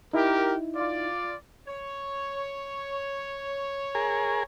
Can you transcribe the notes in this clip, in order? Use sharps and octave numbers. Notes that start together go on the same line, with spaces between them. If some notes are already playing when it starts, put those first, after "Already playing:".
D#4 E4 G4 A#4
F4 D5
C#5
G#4 A#4